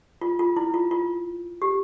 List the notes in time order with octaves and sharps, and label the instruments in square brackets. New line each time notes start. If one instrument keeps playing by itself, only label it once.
[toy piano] F4
F4
E4
F4
F4
G4